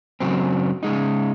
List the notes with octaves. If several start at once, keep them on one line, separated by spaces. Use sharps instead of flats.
F#2 C#3 F#3 C4
C#3 G#3 D#4